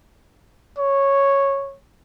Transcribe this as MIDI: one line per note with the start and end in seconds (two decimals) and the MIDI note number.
0.79 1.76 73